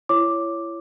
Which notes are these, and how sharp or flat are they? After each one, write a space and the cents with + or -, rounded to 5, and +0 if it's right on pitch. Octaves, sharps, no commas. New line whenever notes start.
E4 +35 C#5 +5 D6 +0